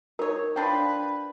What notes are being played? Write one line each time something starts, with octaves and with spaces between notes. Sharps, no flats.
D#4 A#4 C#5
F3 D4 B4 G5